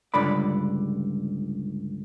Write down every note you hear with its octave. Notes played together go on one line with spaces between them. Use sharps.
C#2 G2 D3 D5 B5